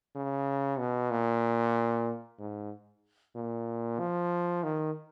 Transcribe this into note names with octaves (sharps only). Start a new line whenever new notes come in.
C#3
B2
A#2
G#2
A#2
F3
D#3